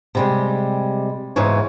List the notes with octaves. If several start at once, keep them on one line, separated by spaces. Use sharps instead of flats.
C3 G3 G#3
E2 G#2 C#3 E3 C#5